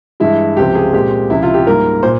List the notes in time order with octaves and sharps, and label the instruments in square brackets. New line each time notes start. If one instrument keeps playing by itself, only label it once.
[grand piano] G2 E3 G#3 E4
C#2 C3 F3 C4 G4
G#4
A#2 G#3 C4 G4
C#2 C3 F3 E4
F4
G4
G#2 G3 A#3 A#4
A#2 C5